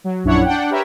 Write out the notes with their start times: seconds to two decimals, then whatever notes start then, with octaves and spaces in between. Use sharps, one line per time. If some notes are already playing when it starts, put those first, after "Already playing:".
0.04 F#3
0.24 A#1 F#2 D4 E4 C#5 F#5
0.45 D4 F#5 G5
0.70 G4 A#4 B4 C#5 E5